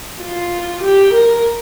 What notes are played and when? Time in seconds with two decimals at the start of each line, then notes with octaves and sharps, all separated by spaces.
0.22 F4
0.83 G4
1.14 A#4